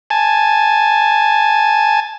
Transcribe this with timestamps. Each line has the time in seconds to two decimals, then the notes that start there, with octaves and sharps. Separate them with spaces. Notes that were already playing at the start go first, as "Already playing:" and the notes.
0.10 G#5 A5